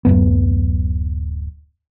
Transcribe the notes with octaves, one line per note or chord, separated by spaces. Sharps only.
D1 G#1 F#2 B3